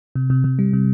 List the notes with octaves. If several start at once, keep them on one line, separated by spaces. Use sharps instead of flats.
C3
C3
C3
G3
C3